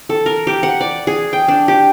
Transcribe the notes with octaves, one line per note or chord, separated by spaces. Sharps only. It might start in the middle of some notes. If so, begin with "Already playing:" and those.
A4
A#4
G4
F#5
D5
G#4
G5
D4
G4